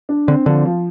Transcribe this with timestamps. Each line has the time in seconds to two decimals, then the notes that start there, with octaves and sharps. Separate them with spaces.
0.09 D4
0.28 D3 C4
0.46 D3 F3
0.65 F3